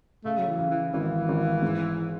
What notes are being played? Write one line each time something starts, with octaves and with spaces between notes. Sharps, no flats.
C#3 A3
F#3
E3
C#3
E3
G#1 E3
G#1
G#2